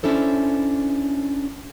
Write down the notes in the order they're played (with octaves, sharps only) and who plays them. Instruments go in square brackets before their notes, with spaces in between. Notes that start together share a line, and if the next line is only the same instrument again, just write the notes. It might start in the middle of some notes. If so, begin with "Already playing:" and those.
[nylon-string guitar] C#4 D4 E4 A4 C5